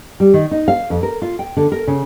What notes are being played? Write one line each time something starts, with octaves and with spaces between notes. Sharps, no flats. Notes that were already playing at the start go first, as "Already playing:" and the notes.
G3
D#3
D#4
F5
F2
A#4
F4
G5
D3
A#4
C#3